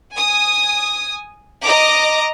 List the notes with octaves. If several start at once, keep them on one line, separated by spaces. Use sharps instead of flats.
G#5 D#6
D#5 A#5 D6